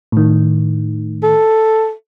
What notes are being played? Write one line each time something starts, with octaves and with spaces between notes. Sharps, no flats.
A2 D#3
A4